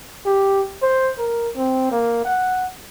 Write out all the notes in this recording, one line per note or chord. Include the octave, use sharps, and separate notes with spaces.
G4
C5
A#4
C4
A#3
F#5